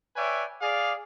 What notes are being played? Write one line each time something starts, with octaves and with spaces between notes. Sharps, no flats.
B4 C#5 D5 E5 G5 G#5
G#4 D5 F5